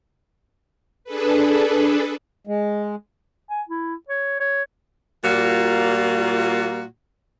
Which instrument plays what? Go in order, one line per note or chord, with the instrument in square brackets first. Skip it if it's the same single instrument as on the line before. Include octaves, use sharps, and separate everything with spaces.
[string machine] D4 G#4 A4 B4
[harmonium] G#3
[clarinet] G#5
E4
C#5
C#5
[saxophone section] A#2 G3 A#3 F4 F#4